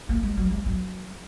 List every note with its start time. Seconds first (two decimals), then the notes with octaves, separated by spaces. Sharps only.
0.09 A#3
0.23 G#3
0.37 F#3
0.51 G#3
0.66 F#3